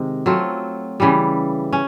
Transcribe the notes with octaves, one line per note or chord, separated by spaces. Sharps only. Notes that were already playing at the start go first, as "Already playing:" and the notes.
Already playing: C3 D#3 G#3
F#3 A3 C4 F4
C#3 E3 G3
C#4